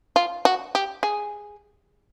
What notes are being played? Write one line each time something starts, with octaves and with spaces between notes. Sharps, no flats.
F4
F#4
G4
G#4